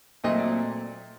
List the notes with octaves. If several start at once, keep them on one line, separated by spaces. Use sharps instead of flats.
A#2 F#3 A3 C4 D#5
D5